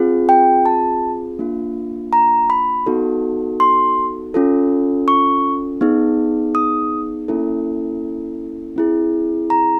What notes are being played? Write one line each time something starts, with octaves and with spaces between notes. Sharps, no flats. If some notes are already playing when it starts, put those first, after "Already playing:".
Already playing: C4 F4 G#4
G5
A5
A#3 D4 F4
A#5
B5
B3 D#4 F#4 A4
C6
C#4 F4 A4
C#6
B3 D#4 G#4
D#6
A#3 C#4 E4 A4
C4 E4 G#4
A#5